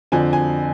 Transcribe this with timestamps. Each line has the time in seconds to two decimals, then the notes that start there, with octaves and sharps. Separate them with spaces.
0.12 F2 D3 F3 C4 G#5
0.33 G#5